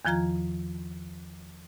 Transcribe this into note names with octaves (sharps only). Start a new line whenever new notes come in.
E2 D#3 F3 F4 A#5 G#6